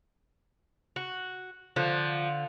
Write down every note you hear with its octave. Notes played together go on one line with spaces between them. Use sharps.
F#4
D3 F3